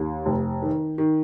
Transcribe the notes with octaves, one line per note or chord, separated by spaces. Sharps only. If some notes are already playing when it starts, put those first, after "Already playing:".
Already playing: D#2
F1
D#3
D#3